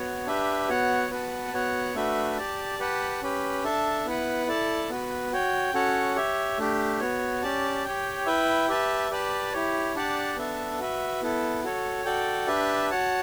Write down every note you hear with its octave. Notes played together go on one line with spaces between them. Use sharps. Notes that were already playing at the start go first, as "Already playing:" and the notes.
Already playing: B3 F#4 C#5
D4 G4 B4 E5
B3 F#4 C#5 F#5
B3 F#4 B4 F#5 A5
B3 F#4 C#5 F#5
A3 D4 F#4 B4 E5
G4 D5 A5
G4 B4 F#5 A5
C#4 G4 B4
D4 A4 E5 A5
B3 E4 B4 F#5
E4 A4 D5 A5
B3 F#4 B4
F#4 C#5 G5
C#4 F#4 A4 C#5 F#5
G4 C#5 E5
A3 D4 G4
B3 F#4 C#5
C#4 G4 D5 A5
G4 C#5 G5
E4 B4 E5 G5
G4 B4 E5 A5
G4 B4 D5 A5
E4 G4 C#5
D4 G4 D5 F#5 A5
B3 D4 A4 E5 A5
F#4 B4 E5
B3 E4 A4
F#4 A4 C#5
F#4 A4 D5 G5
D4 G4 B4 E5 A5
F#4 C#5 F#5 A5